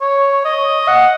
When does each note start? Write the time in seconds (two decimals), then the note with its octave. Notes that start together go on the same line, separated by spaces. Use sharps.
0.01 C#5
0.45 D#5
0.88 F#5